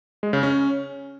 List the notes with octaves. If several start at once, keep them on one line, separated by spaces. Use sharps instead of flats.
G#3
C#3
C#4